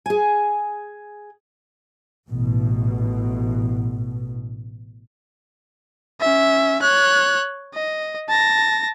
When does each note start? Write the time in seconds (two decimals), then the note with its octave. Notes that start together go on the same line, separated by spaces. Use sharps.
0.06 G#4 G#5
2.30 A1 B2
6.21 C#4 E5
6.82 C#5 F#6
7.74 D#5
8.29 A5 A#6